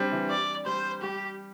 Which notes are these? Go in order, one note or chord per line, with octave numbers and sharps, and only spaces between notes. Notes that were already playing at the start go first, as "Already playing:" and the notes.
Already playing: G3 C4 D4
E3
D5
G3 C5
G3 G4